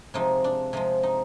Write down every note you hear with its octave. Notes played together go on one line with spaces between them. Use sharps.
C3 F3 G#3 D#4
D4
C3 F3 G#3
D#4